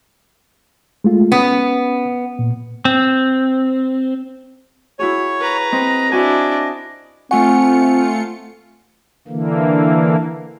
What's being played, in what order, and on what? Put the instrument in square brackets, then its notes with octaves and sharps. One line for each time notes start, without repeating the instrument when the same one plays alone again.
[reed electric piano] G#3 A3 F4
[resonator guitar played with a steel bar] B3 [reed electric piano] C#4 D#6
[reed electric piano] A#2
[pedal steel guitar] C4
[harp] E4 F#4 G#4 [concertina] C#5
[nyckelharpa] B4 A#5
[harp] C4 [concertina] D#5
[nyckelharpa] D4 E4 [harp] F#4 G#5
[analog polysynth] A3 F4 C#7 [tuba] C4 [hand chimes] F#5 G#5 C#6
[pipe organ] D3 E3 A#3